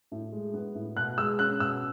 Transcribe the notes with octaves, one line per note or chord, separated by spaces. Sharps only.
A2
G#3
B3
A2
B2 F#6
G#3 E6
C#4 F#6
B2 E6